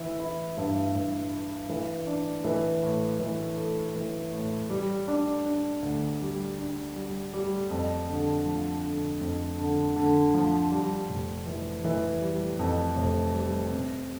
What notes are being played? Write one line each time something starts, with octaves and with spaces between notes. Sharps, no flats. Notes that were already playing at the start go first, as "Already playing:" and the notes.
Already playing: E3 E4
E4
G2
G2
E4
E3
D4
E3
A2
E3
A3
E3
A2
G3
D4
D4
D2
G3
D4
G3
G3
F2
D3
F3
D3
F2
D3
D3
F3
G3
F1
E3
E3
G3
F2
F1
G3
C3